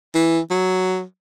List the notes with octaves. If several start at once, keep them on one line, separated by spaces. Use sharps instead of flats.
E3
F#3